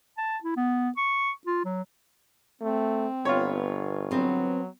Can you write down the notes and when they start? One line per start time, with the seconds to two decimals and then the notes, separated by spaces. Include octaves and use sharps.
0.17 A5
0.43 E4
0.56 B3
0.97 C#6
1.47 F4
1.65 F#3
2.61 A3 C4
3.25 G1 B3 F4 C#5
4.11 F#3 B3 C4